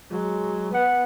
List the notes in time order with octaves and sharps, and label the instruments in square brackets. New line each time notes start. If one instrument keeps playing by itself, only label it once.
[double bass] F#3 [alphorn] G#3
[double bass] B3 [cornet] F#5